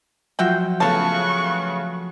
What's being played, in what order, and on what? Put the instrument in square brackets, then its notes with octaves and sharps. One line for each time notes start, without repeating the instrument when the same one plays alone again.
[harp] F3 F#3 F4 [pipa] F#4 E5 G5
[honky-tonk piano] C#3 A3 B3 [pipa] F5 A5 [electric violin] C#6 F#6